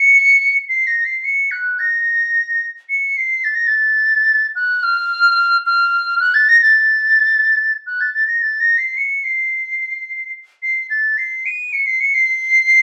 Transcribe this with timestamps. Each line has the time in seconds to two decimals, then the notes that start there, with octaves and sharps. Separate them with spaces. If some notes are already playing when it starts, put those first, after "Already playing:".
Already playing: C#7
0.69 C7
0.87 A#6
1.05 C7
1.24 C#7
1.51 F#6
1.79 A#6
2.89 C#7
3.17 C7
3.44 A6
3.55 A#6
3.67 A6
4.55 F#6
4.83 F6
5.66 F6
6.20 F#6
6.34 A6
6.49 A#6
6.62 A6
7.87 F#6
8.01 A6
8.14 A6
8.28 A#6
8.42 A6
8.60 A#6
8.78 C7
8.97 C#7
9.24 C7
10.62 C7
10.90 A6
11.18 C7
11.46 D#7
11.73 C#7
11.86 C7
12.00 C#7
12.14 C7